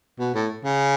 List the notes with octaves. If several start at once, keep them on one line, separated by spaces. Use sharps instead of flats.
B2
A2
C#3